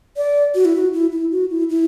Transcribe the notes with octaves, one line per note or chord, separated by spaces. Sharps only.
D5
F#4
E4
F#4
E4
E4
F#4
E4
E4